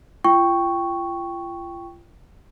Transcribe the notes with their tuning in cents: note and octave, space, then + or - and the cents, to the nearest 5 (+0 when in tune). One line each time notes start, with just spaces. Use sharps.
F4 -35 G5 +0 C#6 +0